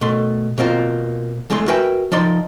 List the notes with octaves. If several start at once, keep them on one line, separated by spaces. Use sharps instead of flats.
B2 A3 C6
B2 A#3 C4 F4
E2 G#3 A3 G#4 C6
F#4 A#4 B4 E5 G5 G#5
F3 D#4 D5 C6